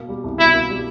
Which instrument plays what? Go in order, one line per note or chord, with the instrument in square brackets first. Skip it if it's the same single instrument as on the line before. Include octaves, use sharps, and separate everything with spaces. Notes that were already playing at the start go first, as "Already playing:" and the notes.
Already playing: [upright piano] B2 A#3
G3
C2
[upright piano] B2 [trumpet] E4
[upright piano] A#3
G3